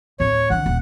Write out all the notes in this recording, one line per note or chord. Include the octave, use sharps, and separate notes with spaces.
D1 E4 C#5
D3 E3 F#5
D#1